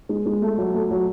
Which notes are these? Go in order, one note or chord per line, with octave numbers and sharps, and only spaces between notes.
G#3
G#3
A3
F#3
A3
F#3